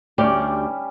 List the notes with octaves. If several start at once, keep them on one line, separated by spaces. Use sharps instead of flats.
D2 G3 C#4 G4 D5